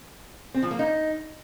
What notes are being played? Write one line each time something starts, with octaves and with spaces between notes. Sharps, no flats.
C4
F3
A#3
D#4